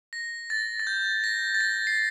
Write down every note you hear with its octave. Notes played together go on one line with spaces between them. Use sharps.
A#6
A6
A6
G6
A#6
A6
A#6
C7